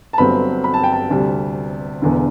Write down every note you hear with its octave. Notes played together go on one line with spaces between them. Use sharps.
A5
G1 G2 F#3 C4 B5
B5
A5
G5
A5
D2 C3 G3
E1 E2 D3